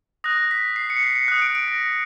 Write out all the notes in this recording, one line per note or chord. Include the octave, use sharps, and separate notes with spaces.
D#6 F#6 A#6
B6
C7
C#7
C7
C#7
D#6 F#6 C#7
D7
D7
A#6